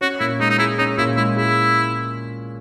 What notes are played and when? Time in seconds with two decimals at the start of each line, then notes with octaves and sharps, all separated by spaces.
0.01 C#4 F#4
0.20 A#2 E4
0.40 G#3 D#4
0.50 D#4
0.59 E4 G#4
0.78 C#4 D#4
0.98 A#2 E4
1.16 G#3 E4
1.36 E4 G#4